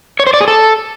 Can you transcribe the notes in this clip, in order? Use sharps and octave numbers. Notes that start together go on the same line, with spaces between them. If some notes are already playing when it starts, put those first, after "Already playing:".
C#5
C5
D5
G#4
A4